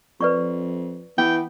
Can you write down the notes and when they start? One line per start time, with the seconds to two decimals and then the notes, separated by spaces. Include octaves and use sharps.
0.21 F2 B4 D5 C#6
1.18 E3 B3 G5